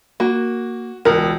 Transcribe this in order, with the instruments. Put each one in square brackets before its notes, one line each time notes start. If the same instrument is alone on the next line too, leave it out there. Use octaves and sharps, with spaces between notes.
[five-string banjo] A#3 [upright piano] F#4
[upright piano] E1 C#2 [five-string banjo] A#4